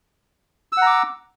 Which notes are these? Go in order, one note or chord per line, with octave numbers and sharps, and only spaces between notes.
F#5 A#5 D6 E6